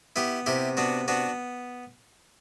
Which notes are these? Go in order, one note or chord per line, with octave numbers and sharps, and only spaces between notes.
B3 E4 G4
C3 E4 G4
B3 D4 F#4
B3 D4 F#4